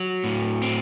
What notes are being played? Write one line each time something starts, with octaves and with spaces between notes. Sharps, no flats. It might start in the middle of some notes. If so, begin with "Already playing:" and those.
Already playing: F#3
A2
C4